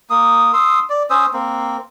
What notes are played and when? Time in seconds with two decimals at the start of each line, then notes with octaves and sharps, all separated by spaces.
0.10 A#3 D#6
0.53 C6 D#6 E6
0.90 D5
1.10 C#4 C5 D#6 E6
1.33 A#3 C4